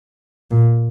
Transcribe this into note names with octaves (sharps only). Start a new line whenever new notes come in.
A#2